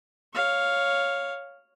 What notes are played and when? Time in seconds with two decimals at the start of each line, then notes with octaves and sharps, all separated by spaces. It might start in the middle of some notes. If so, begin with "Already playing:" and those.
0.33 C#5 F5